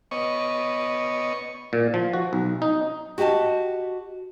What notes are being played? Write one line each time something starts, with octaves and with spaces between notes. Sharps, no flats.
B3 C#5 D#5 C#6
A#2
F3
F#4
B1
D#4
F#4 G4 D#5 G#5 A5